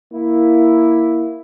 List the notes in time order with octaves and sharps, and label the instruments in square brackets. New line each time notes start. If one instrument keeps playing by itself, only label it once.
[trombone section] A#3 E4